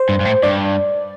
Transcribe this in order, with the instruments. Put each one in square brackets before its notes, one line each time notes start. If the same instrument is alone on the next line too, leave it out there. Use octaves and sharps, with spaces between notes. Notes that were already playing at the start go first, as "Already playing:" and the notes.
Already playing: [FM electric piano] C5
[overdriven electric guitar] G2
G2
A2
[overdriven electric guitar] G2 [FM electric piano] D5